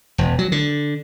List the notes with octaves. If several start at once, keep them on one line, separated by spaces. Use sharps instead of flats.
E1
F#3
D3